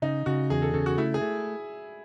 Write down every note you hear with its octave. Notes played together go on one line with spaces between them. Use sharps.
C#3 D#4
C#3 F#4
E2 G#4
A4
C#3 A4
F#4
A3 E4
G#4
A3